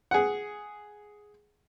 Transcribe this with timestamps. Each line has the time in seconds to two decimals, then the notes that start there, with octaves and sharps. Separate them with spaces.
0.11 G#4 F#5